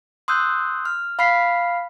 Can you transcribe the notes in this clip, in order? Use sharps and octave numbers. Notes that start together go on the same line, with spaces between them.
C6 D#6 E6 F#6 G6
F6
F5 B5 F6 B6 C7